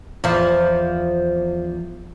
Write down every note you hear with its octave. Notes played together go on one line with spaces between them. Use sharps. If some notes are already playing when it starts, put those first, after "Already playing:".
E2 F3